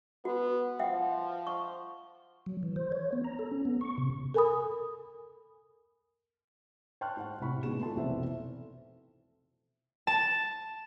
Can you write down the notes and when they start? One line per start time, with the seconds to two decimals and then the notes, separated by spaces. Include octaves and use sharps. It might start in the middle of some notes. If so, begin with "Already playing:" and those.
0.25 B3 F#4
0.79 F3 E5 F#5 G5
1.47 C#6
2.46 F#3
2.63 E3
2.76 C5
2.92 C#5
3.13 B3
3.24 A#5
3.39 A4
3.52 C#4
3.65 B3
3.81 C#6
3.98 C3
4.34 A4 A#4 G#5 B5 D#6
7.01 G5 A5 C6 C#6 F6 F#6
7.17 G#2 C5 F#5
7.40 C2 A2 C3 B5 C#6
7.63 B2 D#3 G#3 E7
7.82 F4 A4 A5 C6
7.96 F1 B1 E3 C4 A4 E5
10.07 A5